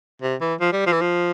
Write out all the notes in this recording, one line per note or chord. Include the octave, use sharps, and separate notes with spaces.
C3
E3
F3
G3
F3
E3
F3